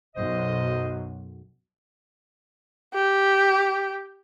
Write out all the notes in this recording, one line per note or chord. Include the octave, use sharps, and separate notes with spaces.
B1 F#2 C5 D#5
G4